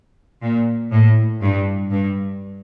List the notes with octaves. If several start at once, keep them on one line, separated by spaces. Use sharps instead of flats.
A#2
A2
G2
G2